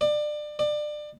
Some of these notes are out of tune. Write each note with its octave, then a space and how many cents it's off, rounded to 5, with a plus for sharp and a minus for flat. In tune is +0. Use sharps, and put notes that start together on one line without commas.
D5 +25
D5 +25